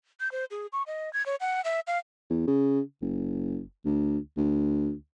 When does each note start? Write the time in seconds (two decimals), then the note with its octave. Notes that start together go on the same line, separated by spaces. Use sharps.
0.20 G6
0.32 C5
0.51 G#4
0.73 C#6
0.87 D#5
1.13 G#6
1.26 C#5
1.41 F#5
1.64 E5
1.87 F5
2.30 E2
2.47 C#3
3.01 F#1
3.85 D2
4.37 D2